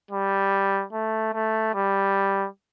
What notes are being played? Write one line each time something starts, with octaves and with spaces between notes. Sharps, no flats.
G3
A3
A3
G3